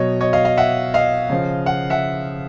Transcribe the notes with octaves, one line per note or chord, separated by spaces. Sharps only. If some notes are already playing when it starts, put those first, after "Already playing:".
Already playing: B2 F#3 C#5 D#5
C#5 D#5
D#5 F5
D#5 F5
E5 F#5
D#5 F5
C#3 F3
F#5
E5 F#5